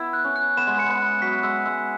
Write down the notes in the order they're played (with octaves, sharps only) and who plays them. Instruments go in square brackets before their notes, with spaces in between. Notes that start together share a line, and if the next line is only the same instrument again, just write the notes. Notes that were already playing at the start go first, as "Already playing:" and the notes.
Already playing: [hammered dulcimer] B3 E4
[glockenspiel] F#6
[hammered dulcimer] C#4
[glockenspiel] F#6
[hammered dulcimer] B3 [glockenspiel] E7
[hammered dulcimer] G#3
[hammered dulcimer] B3 [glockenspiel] C#7
[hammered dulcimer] B3
[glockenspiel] F#6
[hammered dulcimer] F#3 [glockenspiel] B6
[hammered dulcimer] G#3 [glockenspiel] E6
[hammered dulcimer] G#3 [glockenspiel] E6